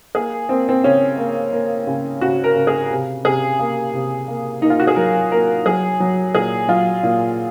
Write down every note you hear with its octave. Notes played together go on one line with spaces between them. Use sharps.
A#3 G#4
A#3 C4
C4
C#3 C#4
A#3
A#3
C#3
C#3 F#4
A#4
C#3
G#4
C3
C3 G#4
A#3
C3
A#3
A#3 D#4
F4
F#4
G#4
F#3 A#4
A#3 A#4
F#3 G#4
F#3
A#2 G#4
F#3 F4
A#2